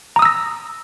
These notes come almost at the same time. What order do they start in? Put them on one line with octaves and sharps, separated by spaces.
A#5 D#6 E6 A#6